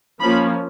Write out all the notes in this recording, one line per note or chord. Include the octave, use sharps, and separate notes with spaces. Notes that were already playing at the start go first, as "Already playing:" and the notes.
F3 A#3 C#4 B5